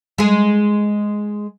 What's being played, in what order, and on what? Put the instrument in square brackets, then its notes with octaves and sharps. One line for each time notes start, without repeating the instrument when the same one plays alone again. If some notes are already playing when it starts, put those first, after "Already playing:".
[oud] G#3 G#4